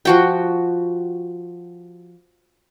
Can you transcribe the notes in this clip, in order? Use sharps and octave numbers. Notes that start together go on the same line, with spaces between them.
F3 F#4 G5